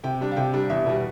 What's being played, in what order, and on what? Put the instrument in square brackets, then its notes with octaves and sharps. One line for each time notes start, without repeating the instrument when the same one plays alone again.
[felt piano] C3 G5
G3 D4
F5
C3 G5
G3 D4
E2 E5
B2 G3